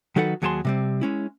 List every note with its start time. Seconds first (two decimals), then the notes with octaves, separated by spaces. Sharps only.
0.16 D#3 F#3 D#4 A4 B4 F#5
0.42 D#2 F#3 G#4 G5 A5 C6
0.65 C3 G3 C4
1.01 G#3 C#4 E4